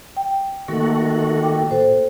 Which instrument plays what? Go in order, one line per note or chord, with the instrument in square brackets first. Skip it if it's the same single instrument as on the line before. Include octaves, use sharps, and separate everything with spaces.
[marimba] G5
[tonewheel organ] D#3 A3 F#4 [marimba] A#3 A4
[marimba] G5 D6
[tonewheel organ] A2 [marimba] F#4 A4 C5